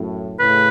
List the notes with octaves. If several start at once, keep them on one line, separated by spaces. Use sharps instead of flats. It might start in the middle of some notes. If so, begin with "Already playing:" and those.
Already playing: F#2 A2
A2 C#3 B4